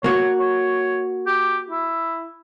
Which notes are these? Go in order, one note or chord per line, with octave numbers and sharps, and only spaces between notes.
A#3 F#4 C#5
C#5
G4
E4